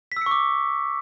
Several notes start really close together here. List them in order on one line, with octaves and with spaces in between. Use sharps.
B6 E6 C#7 C#6 D6